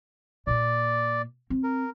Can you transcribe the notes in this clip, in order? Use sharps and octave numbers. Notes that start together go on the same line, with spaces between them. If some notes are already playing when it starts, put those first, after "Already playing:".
A#2 A#3 D5
C4
A#4